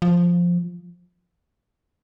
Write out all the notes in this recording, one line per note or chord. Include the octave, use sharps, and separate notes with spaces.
F3